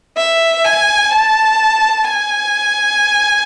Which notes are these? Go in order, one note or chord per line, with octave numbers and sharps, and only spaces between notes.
E5
G#5
A5
G#5